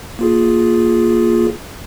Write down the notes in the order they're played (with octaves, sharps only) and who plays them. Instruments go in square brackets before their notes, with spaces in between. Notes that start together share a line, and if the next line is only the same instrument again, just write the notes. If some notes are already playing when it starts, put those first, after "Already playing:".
[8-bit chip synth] A#3 F4 G#4